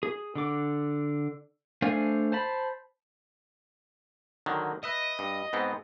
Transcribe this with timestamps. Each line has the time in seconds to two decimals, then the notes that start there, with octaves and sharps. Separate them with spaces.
0.03 G#4
0.36 D3 D6
1.82 A3 D4 C5 F5 G#5
2.32 C5 A5 B5
4.46 D3 D#3 F#3
4.84 B4 D#5 E5
5.19 G2
5.53 G#2 B3 C4